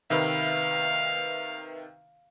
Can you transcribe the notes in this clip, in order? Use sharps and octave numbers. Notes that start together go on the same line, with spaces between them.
C3 D#3 B4 E5 F5